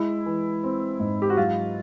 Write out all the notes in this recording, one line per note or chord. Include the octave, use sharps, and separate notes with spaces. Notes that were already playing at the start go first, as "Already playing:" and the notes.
Already playing: G#3 E4
E3
C4
G#2
G4
F#4
F#3 F4